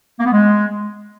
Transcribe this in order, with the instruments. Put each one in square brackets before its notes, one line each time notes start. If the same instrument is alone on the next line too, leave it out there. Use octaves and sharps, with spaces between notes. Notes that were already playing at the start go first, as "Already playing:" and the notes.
[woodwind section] A#3
B3
G#3